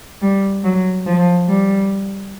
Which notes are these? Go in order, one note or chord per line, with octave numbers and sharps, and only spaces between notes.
G3
F#3
F3
G3